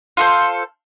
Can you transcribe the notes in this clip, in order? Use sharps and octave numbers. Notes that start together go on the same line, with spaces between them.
F4 A4 C5